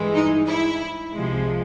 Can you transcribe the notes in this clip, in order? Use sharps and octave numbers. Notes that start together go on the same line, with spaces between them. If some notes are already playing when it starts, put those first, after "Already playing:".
Already playing: G2 E3 G#3
D#4
E4
C2 C3 F3 G#3